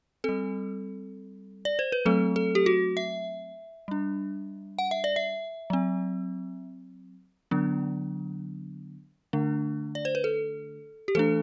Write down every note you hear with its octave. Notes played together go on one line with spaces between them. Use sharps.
G3 C4 A4
D5
C5
B4
F#3 A3 C4 A4
A4
G4
F#4
E5
G3 D4
F#5
E5
D5
E5
F#3 C4
D3 F#3 B3 D4
D3 A3 D4
D5
C5
B4
A4
G4
E3 A3 D4 A4